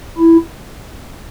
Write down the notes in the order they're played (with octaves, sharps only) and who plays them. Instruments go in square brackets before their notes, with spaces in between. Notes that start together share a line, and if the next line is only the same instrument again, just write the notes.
[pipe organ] E4